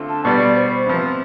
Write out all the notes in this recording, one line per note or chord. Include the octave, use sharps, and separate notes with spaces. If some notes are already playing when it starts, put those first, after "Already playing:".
Already playing: D3 A3 C4 F4
A5
B2 G3 B3 D5
C5
C3 F3 B3